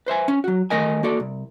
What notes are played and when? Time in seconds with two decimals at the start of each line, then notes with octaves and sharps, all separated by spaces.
0.06 B4 C5 E5 G#5
0.28 C#4
0.44 F#3 F#4
0.70 D#3 A3 A#4 D#5 G#5
1.03 A#3 F#4 A4 D5
1.20 C2